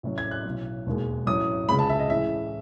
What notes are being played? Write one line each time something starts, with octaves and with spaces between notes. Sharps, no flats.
A1 A2 F#3
G#6
F#6
B1 A2 F#3
E1 D#2 D#3 G#3
A1 A2 F#3 D#6
C#2 C#3 G#3 B5
A5
E5
D#5
A1 A2 E3 G#3 E5